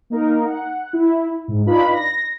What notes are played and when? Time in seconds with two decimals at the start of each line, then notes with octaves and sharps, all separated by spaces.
0.10 A#3 D#4 A#4
0.45 F#5
0.93 E4
1.48 G#2
1.66 D4 D#4 F4 B4 B5
1.94 A#6